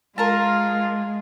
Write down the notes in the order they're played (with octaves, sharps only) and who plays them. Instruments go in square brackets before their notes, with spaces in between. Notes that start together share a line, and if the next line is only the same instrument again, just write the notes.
[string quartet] G#3 [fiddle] F4 [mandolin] A#4 A5